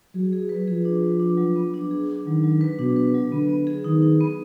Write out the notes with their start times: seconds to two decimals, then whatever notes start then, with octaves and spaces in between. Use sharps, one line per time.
0.15 F#3 G#4
0.33 G#4
0.49 B4
0.68 F3 G#4
0.85 D4
1.03 B4
1.20 D4
1.37 F#3
1.56 B3
1.74 D4
1.91 G#4
2.09 D4
2.27 D#3 F#3
2.43 F#3
2.61 B4
2.79 B2 D4
2.96 B4
3.14 F#3
3.32 D3 B3
3.49 B3
3.67 G#4
3.84 D#3 D#4
4.02 D#4
4.21 B3